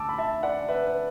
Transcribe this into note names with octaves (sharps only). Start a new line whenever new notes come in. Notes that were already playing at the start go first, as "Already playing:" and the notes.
Already playing: D2 D3 A5 D6 E6
B5
E5 A5
D5 F#5
B4 E5
B4